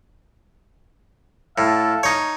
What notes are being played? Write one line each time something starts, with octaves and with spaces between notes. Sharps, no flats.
A2 A4 E5 F5
D#4 C#5